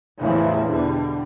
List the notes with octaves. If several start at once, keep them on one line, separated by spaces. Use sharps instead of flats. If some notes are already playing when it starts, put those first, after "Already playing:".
E2 A2 C#3 E3 F3 G3
B2 D3 G3